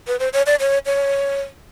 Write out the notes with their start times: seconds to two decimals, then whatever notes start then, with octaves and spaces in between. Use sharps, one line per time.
0.07 B4
0.19 C5
0.33 C#5
0.46 D5
0.60 C#5
0.86 C#5